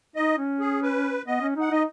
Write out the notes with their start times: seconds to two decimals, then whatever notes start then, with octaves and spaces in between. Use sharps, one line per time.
0.16 D#4 D#5
0.38 C#4
0.60 G#4
0.82 B4
1.27 B3 D#5
1.42 C#4
1.56 D#4 F#5
1.71 D#4 D#5